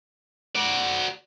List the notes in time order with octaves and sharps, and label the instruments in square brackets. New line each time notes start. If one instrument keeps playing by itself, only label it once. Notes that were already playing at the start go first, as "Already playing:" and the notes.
[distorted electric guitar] F#4 D5